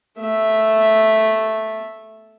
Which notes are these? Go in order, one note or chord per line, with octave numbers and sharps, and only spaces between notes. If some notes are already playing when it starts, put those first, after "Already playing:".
A3 E5